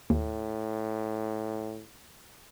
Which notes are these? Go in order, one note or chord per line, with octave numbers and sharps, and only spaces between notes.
D#2 A2